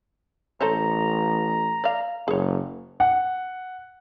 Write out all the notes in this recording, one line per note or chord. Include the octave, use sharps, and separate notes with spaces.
A1 A4 C5 C#5 A#5
D5 F5
F#1 G#4 C#5
F#5